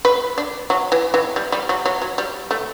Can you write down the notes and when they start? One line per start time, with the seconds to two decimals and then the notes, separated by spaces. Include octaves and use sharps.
0.05 B4
0.38 D4
0.70 F#3
0.92 E3
1.14 E3
1.36 G3
1.52 G3
1.69 F#3
1.86 F#3
2.02 F#3
2.18 G3
2.51 A3